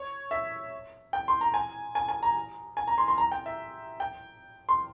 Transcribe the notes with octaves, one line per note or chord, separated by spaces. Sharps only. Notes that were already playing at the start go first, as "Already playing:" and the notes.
Already playing: C#5
E5
G5
C6
A#5
G#5
G#5
G#5
A#5
G#5
A#5
C6
C6
A#5
G5
E5
G5
C6